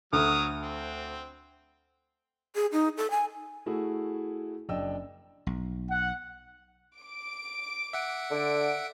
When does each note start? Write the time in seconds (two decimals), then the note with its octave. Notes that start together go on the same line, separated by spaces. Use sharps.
0.13 D2 F#3 D#6 F6
0.62 C4
2.55 G#4
2.72 D#4
2.97 A4
3.11 G#5
3.66 A3 E4 F#4 G#4
4.69 F#1 D4 D#5 G5 E6
5.47 B1
5.91 F#5
6.98 D6 D7
7.93 E5 F#5
8.31 D3 D7